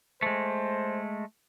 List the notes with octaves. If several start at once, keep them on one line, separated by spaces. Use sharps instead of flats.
G#3 A3 C5